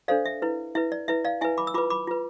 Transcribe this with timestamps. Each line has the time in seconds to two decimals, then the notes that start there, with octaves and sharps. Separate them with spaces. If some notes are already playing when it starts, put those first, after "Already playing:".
0.08 D4 A4 C5 D5 F5
0.25 E5
0.42 E4 B4
0.75 E4 B4 E5
0.92 D5
1.08 E4 B4 E5
1.25 D5 F5
1.41 E4 B4 E5 G#5
1.58 B5 D6
1.67 E6
1.74 F4 B4 B5 D6
1.90 B5 D6
2.07 F4 B4